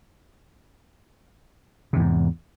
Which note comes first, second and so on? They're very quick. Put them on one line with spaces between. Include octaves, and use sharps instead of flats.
C3 E2 G#2